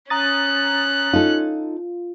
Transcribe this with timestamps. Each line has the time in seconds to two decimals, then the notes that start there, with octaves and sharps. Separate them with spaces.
0.10 C#4 A#5 D#6 F#6 A6
1.13 D#4 F4 A4